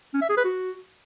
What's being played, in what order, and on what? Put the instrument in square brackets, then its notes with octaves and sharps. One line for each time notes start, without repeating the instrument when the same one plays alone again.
[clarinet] C#4
E5
G#4
B4
F#4